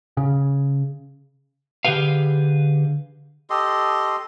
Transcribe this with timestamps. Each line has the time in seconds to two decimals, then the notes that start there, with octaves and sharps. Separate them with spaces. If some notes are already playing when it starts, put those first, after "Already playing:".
0.17 C#3
1.85 D3 G4 G#4 B4 F5
3.50 G4 A4 D#5 C6